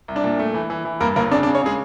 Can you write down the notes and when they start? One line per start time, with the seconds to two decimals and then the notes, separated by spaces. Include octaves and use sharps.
0.08 C2
0.16 D4 D5
0.24 A#2
0.39 A3
0.54 E3
0.70 E3
0.85 E3
1.01 G2 A#3 A#4
1.16 G1 A#3 A#4
1.31 C#3 D4 D5
1.43 D4 D5
1.47 C#3
1.55 C#4 C#5
1.63 C#3 G#3 G#4